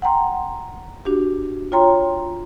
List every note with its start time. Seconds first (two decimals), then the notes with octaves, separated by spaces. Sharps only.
0.02 F#5 G5 A#5 C6
1.05 D4 F#4 G4
1.72 F4 C#5 G5 A#5 C6